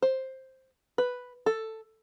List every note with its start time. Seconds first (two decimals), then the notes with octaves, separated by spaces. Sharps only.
0.02 C5
0.98 B4
1.46 A4